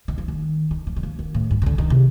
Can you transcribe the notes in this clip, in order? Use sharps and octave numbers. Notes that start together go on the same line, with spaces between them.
D#3
F3
D#3
D#3
F3
D#3
F3
D#3
A2
G2
C3
D3
D#3
C3